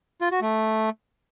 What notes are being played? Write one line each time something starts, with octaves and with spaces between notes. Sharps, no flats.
F4
F#4
A3